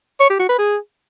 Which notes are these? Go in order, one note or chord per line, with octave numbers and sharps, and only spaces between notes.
C#5
G4
F#4
B4
G#4